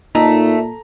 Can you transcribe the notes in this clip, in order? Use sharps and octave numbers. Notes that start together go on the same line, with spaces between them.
A#2 A3 D#4 A#5